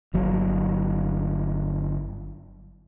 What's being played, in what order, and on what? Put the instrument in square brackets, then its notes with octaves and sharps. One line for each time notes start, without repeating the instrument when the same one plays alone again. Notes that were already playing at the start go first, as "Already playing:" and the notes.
[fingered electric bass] G1 F#3